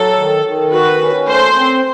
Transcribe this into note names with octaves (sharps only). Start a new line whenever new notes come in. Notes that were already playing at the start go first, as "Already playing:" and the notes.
Already playing: F#3 A4
D#3
D#3
F#4 B4
C#4
A3 C5
C4